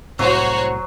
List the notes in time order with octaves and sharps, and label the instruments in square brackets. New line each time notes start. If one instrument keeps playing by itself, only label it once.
[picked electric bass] C2 A2 C3 [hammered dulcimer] F#3 [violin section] F#4 C5 C#5